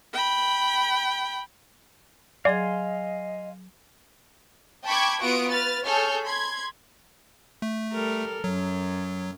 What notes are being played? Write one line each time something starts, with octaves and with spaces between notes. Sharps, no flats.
G5 B5
F#3 G#4 D5 D#5 F5 G#5 C6 G#6
G5 A5 B5 C#6 D6 G#6
B3 F4 F#4 C#6 D#6 D7
B4 F6 A6
G#4 A4 C#5 F6 G6
B5 C6 G#6
A3
G3 A4 A#4
F#2 F#3